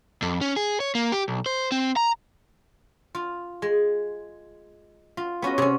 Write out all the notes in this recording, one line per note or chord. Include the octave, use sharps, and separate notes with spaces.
F2
C#4
G#4
C#5
A#3
G4
B1
C5
C4
A#5
F4
G#3
F4
B3 C#4 F#4 D#5
C3 C#4